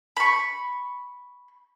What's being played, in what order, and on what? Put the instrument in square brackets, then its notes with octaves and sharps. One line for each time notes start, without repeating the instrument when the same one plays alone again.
[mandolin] B5 C#6